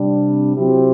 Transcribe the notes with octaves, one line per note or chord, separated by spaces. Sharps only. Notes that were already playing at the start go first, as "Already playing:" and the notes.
Already playing: C3 G3 D4
C3 F#3 C4 E4 G4